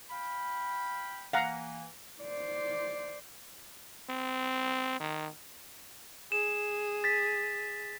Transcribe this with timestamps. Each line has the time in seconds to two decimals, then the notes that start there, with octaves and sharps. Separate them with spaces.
0.10 F5 G5 B5
1.33 E3 A#3 F5 F#5 A#5
2.22 C5 D5
4.09 C4
5.00 D#3
6.32 G#4 E7
7.04 A6 B6